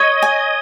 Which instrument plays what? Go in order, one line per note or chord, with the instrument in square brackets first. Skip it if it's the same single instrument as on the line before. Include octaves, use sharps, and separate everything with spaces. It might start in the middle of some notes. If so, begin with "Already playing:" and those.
Already playing: [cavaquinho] C#5 [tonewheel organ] D#5
[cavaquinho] G#5